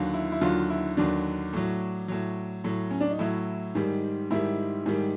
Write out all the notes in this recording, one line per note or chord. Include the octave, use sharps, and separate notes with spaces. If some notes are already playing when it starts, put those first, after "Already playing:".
Already playing: D#2 D3 F#3
E4
E4
D#2 D3 F#3 F4
E4
D#2 D3 F#3 D4
A2 F#3
A2 F#3
A2 F#3
C#4
D4
D#4
A2 F#3 E4
G#2 D#3 G3
G#2 D#3 G3 E4
G#2 D#3 G3